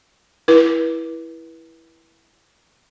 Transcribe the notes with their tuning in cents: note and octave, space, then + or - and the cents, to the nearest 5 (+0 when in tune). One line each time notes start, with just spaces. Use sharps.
E4 +0 B4 -35